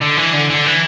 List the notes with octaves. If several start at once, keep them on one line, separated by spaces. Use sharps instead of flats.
D3
E3
D3
D3
E3